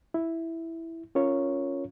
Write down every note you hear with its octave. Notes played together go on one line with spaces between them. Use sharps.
E4
C#4 F4 A#4 C#5